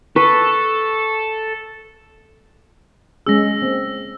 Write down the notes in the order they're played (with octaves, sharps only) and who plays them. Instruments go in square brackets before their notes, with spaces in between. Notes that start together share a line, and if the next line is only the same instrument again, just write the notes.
[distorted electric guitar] A4 [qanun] B4 [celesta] C#6
[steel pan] G#3 C#4 G#4 [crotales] E6 A#6
[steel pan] A#3 C4